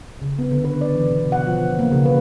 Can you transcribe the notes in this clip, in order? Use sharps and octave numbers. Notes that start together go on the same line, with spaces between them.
C#3
B3
D3
B4
D5
E3
B2
F#5
F3
A#3
C#3
B4